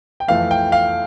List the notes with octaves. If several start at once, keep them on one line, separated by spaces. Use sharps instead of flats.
G5
F2 E3 A3 F5
G5
F5